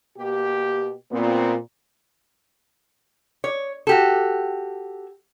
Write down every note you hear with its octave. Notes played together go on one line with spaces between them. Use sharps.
B2 A#3 G4
A#2 B3 C4
C#5
F#4 G4 A4